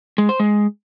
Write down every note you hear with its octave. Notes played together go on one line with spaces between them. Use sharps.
G#3
C5
G#3